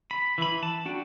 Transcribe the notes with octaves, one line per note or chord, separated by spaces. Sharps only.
B5
E3 B5
A5
D4 F#4 G5